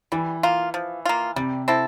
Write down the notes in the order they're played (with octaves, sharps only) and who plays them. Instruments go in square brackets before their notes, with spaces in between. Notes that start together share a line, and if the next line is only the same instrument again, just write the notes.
[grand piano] E3 [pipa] G3
[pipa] A#3 F4
F3
A#3 F4
[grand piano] C3 [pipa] G3
[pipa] C4 E4 A4